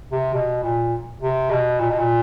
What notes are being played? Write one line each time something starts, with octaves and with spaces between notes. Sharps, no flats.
C3
B2
A#2
C3
B2
A#2
B2
A#2